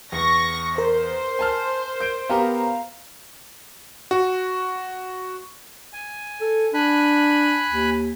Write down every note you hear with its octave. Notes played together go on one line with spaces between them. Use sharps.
E2 C#6 A#6
A#4 C5
G#5 A5 F6
G6 D7
B3 G4 A#4 F5 A#5
F#4
G#5
A4
D4 G#5 B5 F#6
D#2